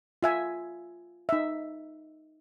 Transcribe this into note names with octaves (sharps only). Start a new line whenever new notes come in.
F4 E5 G#5
D#4 E5